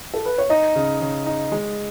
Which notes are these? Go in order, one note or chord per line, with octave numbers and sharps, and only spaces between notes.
A4
B4
C#5
D#4 D#5
C#3
C#3
D#4
G#3